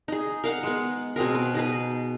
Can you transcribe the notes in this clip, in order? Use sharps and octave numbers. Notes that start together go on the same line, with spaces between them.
D#4 G#4
A#4 F5 F#5
G#3 B3
B2 C4 G#4 A#4
B4
D#4 G#4 B4